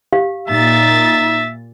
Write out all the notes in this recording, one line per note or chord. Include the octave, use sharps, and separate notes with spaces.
G4 F5
A#2 D#4 E5 A6